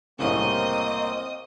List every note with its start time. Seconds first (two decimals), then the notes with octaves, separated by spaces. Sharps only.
0.19 C2 A2 C#3 A#3 C4 D#5 D#6